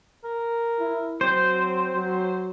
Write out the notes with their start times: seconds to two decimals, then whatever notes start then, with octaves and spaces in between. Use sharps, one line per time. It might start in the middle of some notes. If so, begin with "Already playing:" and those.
0.24 A#4
0.79 E4
1.21 F#3 C4 C5
1.95 F#3